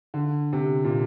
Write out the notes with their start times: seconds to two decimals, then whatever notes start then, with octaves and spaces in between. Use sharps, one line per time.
0.14 D3
0.53 C3
0.84 A#2